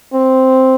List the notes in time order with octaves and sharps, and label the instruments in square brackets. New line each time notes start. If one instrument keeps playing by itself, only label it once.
[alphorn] C4